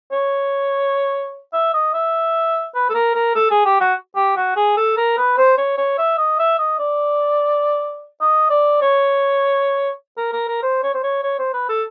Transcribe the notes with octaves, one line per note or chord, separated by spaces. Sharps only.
C#5
E5
D#5
E5
B4
A4
A#4
A#4
A4
G#4
G4
F#4
G4
F#4
G#4
A4
A#4
B4
C5
C#5
C#5
E5
D#5
E5
D#5
D5
D#5
D5
C#5
A#4
A#4
A#4
C5
C#5
C5
C#5
C#5
C5
B4
A4